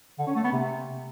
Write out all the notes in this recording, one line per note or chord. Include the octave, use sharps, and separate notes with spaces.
D3
C#4
A3
B3
C3